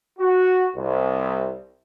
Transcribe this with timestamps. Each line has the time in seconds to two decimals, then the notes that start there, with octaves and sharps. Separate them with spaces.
0.19 F#4
0.76 C2